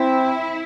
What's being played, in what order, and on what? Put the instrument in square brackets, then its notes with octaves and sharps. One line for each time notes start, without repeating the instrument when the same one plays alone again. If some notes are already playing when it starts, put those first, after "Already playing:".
Already playing: [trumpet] C4 [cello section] E4